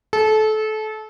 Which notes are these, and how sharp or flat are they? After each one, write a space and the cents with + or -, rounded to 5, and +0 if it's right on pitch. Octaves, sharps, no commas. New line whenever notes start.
A4 -25